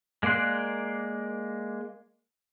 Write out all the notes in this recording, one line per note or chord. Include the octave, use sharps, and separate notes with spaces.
G#3 A#3 D5 C6 F#6